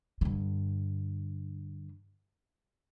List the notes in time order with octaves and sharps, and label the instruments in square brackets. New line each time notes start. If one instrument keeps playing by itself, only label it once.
[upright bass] G2 D3